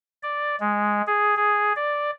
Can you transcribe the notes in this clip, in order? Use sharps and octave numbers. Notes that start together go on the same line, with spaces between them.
D5
G#3
G#4
G#4
D5